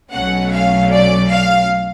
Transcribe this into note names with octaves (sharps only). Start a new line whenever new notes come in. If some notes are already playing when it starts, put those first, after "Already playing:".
B1 B2 F#3 A3 C#4 F#5
F5
D5
F5